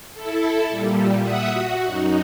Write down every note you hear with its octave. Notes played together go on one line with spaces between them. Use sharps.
E4 A4
A#2 G3
E5 F#5 D#6
F#4
F#2 D#4